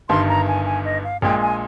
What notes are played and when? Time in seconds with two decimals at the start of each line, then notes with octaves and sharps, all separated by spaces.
0.09 G1 G2 D#3 C6
0.28 A#5
0.48 G#5
0.66 G#5
0.85 D#5
1.04 F5
1.22 A#1 A#2 G#3 G5
1.42 G#5